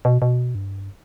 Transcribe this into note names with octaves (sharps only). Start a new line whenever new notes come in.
B2
B2
G2